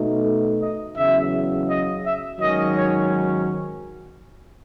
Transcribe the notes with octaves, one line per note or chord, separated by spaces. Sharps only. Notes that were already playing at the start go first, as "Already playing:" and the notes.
Already playing: B2 A3 D#4
D#5
E2 C#3 F#3 E5
D#5
E5
G#2 D#3 F#3 C#4 D#5
C#5